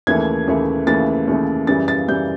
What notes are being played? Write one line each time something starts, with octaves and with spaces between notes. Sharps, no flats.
D#2 C#3 E3 A3 G#6
D#2 C#3 E3 A3
D#2 C#3 E3 A3 A6
D#2 C#3 E3 A3
F#2 C#3 E3 G3 A6
A6
F#2 C#3 E3 G3 G6